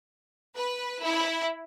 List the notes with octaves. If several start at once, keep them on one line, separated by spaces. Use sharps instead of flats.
B4
E4